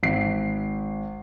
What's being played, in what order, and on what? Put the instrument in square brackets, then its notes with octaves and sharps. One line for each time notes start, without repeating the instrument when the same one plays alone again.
[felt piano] G#1 C7